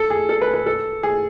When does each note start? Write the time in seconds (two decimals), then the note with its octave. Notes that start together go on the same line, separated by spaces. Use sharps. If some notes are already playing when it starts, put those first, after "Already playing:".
Already playing: A4
0.10 G#4
0.29 A4
0.41 B4
0.54 B4
0.66 A4
1.03 G#4